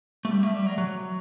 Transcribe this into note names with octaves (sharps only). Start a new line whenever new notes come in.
A3
G3
A3
G3
F#3
F#3